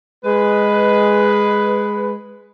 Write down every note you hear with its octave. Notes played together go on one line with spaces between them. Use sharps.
G#3 B4